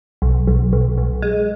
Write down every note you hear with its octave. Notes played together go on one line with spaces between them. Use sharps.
B1
B1
B1
B1
G#3